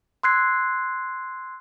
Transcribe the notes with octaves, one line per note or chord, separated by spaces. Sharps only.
C6 E6 F#6 G#6 C7